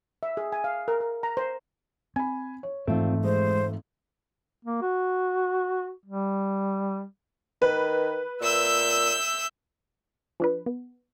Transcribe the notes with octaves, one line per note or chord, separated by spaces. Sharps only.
E5
G#4
G#5
F5
A#4
A#4
A#5
C5
C4 G#5 B5
C#5
G#1 F2 G#2 E3 A3 C4 F4
G#3 C5
A#3
F#4
G3
D#3 B4
A#2 E5 E6 G6
F3 D4 B4
B3